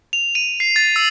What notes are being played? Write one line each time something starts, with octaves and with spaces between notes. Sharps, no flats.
F7
D#7
C7
A6
E6